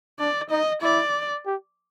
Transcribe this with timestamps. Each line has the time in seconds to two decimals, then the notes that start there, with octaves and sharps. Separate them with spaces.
0.19 D4 D5
0.51 D#4 D#5
0.82 E4 D5
1.46 G4